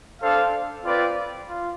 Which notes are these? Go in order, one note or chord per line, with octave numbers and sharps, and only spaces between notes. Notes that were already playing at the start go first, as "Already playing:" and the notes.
D4 A4 C5 F5
C4 F4 B4 D5
F4